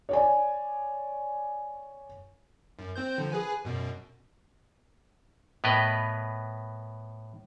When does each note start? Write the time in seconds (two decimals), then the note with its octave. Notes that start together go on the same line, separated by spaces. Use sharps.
0.09 C#5 D5 G#5
2.79 F#2
2.96 C4 C5 G6
3.18 D3 F3
3.32 G#4 B4 G#5
3.65 F#2 B2
5.64 A2 B3 A#4 B4 D#5